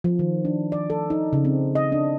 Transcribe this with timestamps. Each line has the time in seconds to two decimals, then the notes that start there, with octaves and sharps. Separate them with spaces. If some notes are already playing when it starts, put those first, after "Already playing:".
0.04 F3
0.19 D#3
0.45 D4
0.72 D5
0.90 A4
1.10 D#4
1.33 C#3
1.45 C4
1.75 D#5
1.92 D4